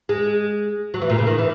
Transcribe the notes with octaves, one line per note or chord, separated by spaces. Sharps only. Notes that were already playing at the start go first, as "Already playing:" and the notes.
G#3
F#3
E3
A#2
C#3
D#3
E3